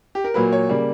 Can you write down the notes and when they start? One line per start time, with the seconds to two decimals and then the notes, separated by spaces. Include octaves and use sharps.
0.15 G4
0.24 A#4
0.34 A#2 F#3 A#3 B4
0.52 C#5
0.69 C#3 G3 A#3